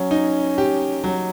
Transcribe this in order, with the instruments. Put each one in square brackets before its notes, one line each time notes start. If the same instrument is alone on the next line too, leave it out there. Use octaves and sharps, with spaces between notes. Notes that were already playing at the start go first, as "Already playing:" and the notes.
Already playing: [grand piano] F#3 [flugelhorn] C#4
[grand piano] D#4
G4
F#3